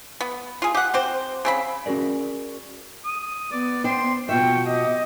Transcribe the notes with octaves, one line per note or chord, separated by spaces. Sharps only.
B3
F4 G#4
G4 F#5
C4 G4 C5
C#3 C4 B5
C#4 F#4 G#4 A#4 D5
D#6
B3 D5
C5 D5 G5 C6
B2 F4 E5 G5 C#6
G4 D#5